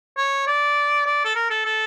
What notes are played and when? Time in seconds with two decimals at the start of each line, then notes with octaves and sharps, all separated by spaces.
0.17 C#5
0.48 D5
1.06 D5
1.25 A4
1.36 A#4
1.50 A4
1.65 A4